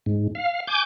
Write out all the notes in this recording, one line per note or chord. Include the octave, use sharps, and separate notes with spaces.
G#2
F5
G#5 D6 G6